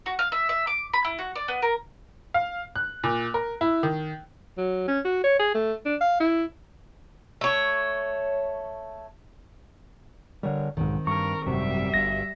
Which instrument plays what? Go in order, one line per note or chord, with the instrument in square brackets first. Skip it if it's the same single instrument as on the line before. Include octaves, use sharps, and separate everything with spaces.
[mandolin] F#4
F5
E5
E5
D6
B5
E4
F#4
D5
B3
A#4
[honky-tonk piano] F5
F#6
A#2
A#4
E4
D#3
[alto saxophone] F#3
C#4
F#4
C#5
G#4
A3
D4
F5
E4
[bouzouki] A3 C#5
[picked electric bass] D3 G3 [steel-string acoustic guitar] A#4 C#5
[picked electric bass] B1 G#2 [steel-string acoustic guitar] D#3 C4
[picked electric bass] G2 [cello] A#4 [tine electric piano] C#6
[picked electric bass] G#1 F#2 C3 [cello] G3 E5
[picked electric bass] G1 G2 [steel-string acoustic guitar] B3 F#4 [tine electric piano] A#6